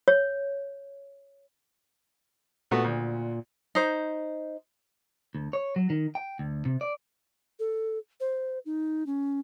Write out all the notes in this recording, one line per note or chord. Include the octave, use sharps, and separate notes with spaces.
C#5
A#2 A3 B3 F#4
D2
D#4 C5
D2
C#5
F#3
D#3
G5
D2
C3
D5
A4
C5
D#4
C#4